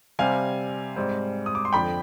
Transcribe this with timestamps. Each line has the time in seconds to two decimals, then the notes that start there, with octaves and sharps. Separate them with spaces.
0.19 C3 G3 C4 F5 G#5
0.96 G#2 G3 C4
1.46 D#6
1.55 D6
1.65 C6
1.73 F2 D3 F3 G5 B5